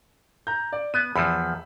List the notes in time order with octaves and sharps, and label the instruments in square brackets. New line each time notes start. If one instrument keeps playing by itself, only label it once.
[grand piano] A#5 G6
D5
[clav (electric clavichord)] B3 [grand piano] D#7
[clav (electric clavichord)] E2 F3 [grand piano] B5 E6